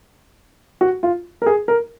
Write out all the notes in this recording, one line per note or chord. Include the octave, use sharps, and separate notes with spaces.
F#4
F4
A#4
G#4
A#4